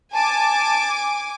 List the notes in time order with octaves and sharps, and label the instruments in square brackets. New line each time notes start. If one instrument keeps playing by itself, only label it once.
[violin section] G#5 D6 [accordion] A5